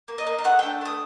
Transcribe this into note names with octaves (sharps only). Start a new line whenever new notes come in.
A#3
D#5
A#3
D#5
A3 F#5
D4 G5
A3 D#6